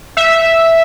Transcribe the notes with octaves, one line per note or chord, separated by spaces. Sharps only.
E5